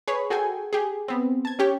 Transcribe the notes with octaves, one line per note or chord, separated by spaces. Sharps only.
G#4 B4 C#5 B5
F#4 G#4 A4 G5 G#5
G4 G#4
B3 C4
A5 G#6
C#4 G4 C#5